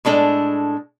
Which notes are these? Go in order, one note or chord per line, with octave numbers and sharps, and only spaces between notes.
A2 G#3 D4 A4